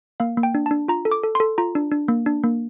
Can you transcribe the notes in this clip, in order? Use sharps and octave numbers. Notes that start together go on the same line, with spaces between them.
A#3 F5
A#3
G5
D4
D4 A5
F4 A#5
A4
D6
A4
C6
A4
F4 A#5
D4
D4
A#3
D4
A#3